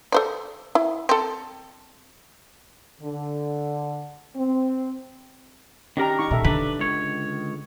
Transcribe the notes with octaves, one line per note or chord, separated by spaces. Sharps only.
A4 C5 D5
E4
C4 A4
D3
C4
D#3 C#4 D4 G4 A#4 A#5
D#4 C#6
A#2 A4 E5 A#5
D3 D4 B4
C#2 C#5